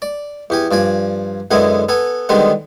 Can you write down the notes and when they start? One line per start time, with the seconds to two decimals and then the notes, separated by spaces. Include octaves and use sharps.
0.02 D5
0.50 E2 G4 G#5
0.71 G2 F3 D5 G#5
1.51 F#2 D3 G#3 B3 E4 G#5
1.89 B3 A4 G#5
2.29 D3 D#3 G3 G#3 B3 C4